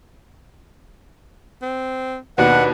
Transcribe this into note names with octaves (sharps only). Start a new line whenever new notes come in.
C4
D#2 B2 D4 B4 F#5